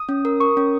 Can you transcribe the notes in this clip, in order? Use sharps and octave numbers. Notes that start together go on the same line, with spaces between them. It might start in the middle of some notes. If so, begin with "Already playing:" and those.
Already playing: D#6
C#4
A#4
A#4 C#6
C#4